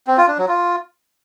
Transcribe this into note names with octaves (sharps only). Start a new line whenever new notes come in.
C4
F4
D4
F#3
F4